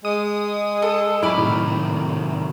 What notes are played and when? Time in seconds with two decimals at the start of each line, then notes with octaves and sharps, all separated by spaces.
0.05 G#3 D#6
0.82 A4
1.23 F#2 F#3 C#4 E4 B5 D6 F6
1.38 A2 C3 D#3 F#3